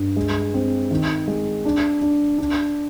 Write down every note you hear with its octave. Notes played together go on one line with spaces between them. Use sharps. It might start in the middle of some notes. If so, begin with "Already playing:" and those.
Already playing: G2
G#3
C4
D#3
G#3
D4
D4
D4